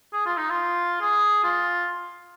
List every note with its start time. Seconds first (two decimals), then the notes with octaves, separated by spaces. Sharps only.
0.13 G#4
0.26 F4
0.37 D#4
0.50 F4
1.01 G#4
1.44 F4